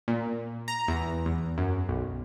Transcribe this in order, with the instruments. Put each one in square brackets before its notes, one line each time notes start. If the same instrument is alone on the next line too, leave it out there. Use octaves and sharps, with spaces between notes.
[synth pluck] A#2
A#5
E2
E2
F#2
B1